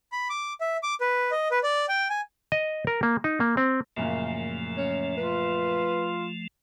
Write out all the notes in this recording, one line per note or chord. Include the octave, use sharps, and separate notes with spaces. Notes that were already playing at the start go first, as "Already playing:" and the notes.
B5
D6
E5
D6
B4
D#5
B4
D5
G5
G#5
D#5
A#4
A#3
D#4
A#3
C4
F#2 A#2 C#3 F3 A3
C#4
F4 B4